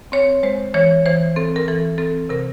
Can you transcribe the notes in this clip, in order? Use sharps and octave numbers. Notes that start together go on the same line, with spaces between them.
C4 C#5
G#3 C5
E3 C#5
E3 C5
C4 A4
A#4
E3 A4
C4 A4
C3 A#4